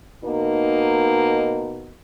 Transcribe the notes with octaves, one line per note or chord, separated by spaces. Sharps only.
B2 A#3 D#4